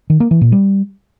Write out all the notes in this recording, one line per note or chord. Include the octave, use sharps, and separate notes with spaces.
D#3
A#3
E3
A#2
G3